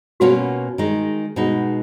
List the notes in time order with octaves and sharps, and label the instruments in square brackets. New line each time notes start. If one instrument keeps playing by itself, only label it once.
[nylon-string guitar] B2 A#3 C#4 F4 [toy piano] F#4
[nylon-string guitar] D#3 G#3 D#4
B2 G#3 D#4